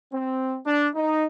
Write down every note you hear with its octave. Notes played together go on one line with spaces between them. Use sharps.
C4
D4
D#4